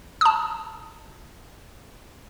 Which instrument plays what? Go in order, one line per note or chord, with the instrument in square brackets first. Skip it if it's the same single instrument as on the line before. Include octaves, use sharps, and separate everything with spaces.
[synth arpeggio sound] A5 D#6